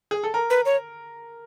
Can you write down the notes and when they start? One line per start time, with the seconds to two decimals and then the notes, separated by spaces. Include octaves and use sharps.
0.11 G#4
0.23 A4
0.34 A#4
0.50 B4
0.65 C#5